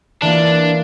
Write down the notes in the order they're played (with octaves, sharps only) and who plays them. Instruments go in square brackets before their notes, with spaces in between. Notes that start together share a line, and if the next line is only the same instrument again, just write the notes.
[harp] E3 A#3 F4 [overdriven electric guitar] D4